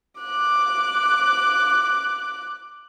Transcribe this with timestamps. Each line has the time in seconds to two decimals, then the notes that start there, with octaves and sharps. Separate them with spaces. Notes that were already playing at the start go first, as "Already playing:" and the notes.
0.20 D6 F#6